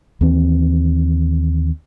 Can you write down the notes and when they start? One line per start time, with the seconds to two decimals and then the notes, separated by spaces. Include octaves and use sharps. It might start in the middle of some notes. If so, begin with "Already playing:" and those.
0.21 D#2 E3 C4